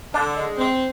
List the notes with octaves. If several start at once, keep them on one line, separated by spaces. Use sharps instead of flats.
D3 D4
G#3
C4